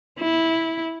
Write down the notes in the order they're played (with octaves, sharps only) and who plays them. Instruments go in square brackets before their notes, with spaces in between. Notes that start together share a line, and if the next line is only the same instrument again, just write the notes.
[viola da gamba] E4